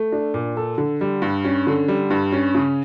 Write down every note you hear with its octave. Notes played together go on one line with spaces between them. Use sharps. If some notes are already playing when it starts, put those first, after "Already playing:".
Already playing: A3
D4
A#2
A4
D3
G3
G2
C#4
D3
G3
G2
C#4
C#3